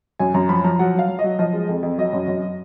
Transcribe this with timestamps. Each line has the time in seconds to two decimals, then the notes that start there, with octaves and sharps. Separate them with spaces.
0.19 F#2 G#5
0.34 F#2 A#5
0.49 F3 B5
0.64 F3 A#5
0.79 F#3 F#5
0.94 F#3 F5
1.09 F#3
1.19 D#5
1.24 F#3
1.39 F3 D#5
1.53 G#3
1.69 F2
1.83 F2
1.98 F#3 D#5
2.13 F#2
2.28 F#2